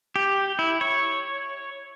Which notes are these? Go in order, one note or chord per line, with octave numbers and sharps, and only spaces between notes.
G4
E4
C#5